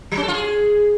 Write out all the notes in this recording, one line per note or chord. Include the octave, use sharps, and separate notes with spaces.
F#3
C#4
A4
F4
G#4